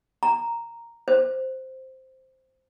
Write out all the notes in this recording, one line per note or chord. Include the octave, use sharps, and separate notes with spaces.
A#5
C5